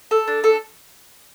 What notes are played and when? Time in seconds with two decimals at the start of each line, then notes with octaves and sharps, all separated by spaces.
0.11 A4
0.28 D4
0.44 A4